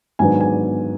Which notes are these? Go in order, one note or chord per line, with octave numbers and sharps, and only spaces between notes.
G#2 D#3 F#3 B3 D4 G#5
G#5